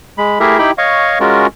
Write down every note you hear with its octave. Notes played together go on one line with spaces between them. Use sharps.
G#3 B5
A3 E4 G4 G#4 A#4 E5
D#4 E4 G4 G5 B5
C#5 D#5 F5 C#6
G#3 C#4 F4 F#4 A#4